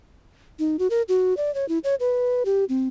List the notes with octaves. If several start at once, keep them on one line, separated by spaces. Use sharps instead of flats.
D#4
F#4
A#4
F#4
D5
C#5
E4
C#5
B4
G4
C4